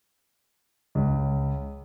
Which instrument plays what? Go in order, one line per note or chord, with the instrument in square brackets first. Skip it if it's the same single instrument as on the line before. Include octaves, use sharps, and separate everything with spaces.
[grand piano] C#2